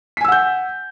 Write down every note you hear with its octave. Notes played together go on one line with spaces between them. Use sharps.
F#5 G#5 E6 G6 B6